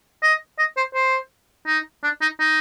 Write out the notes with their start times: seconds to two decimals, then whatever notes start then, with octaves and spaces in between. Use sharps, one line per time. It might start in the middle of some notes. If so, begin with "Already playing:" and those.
0.23 D#5
0.59 D#5
0.77 C5
0.95 C5
1.67 D#4
2.04 D4
2.21 D#4
2.40 D#4